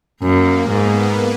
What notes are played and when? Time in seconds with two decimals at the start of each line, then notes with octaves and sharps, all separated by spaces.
0.21 F#2 A#3
0.69 G#2 B3